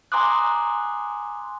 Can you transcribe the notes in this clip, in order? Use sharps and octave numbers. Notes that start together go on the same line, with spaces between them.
G#5 A#5 C6 D6 D#6 F#6